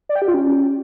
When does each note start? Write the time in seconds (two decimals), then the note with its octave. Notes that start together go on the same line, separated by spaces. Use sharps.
0.09 D5
0.16 G5
0.22 G4
0.28 F4
0.34 C#4